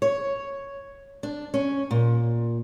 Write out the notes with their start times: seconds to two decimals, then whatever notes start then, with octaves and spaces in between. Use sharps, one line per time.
0.02 C#5
1.23 D4
1.54 C#4
1.91 A#2